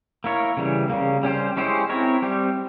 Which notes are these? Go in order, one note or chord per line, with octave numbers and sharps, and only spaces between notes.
A#3 E4 A#4 C#5
C#3 E3 G3
C#3 G3 A#3
G3 C#4 G4 C5
G#3 C#4 E4 G4 C5
C4 E4 A#4 C#5
G3 C4 G4